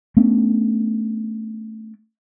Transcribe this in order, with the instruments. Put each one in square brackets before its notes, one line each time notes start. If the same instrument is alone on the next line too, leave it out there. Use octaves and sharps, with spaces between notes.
[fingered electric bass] A3 B3 C#4 D4